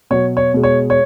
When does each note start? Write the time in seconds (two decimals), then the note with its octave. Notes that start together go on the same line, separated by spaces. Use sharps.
0.10 B2 F#3 C#5
0.37 C#5
0.54 B2 G#3
0.63 C#5
0.90 C#5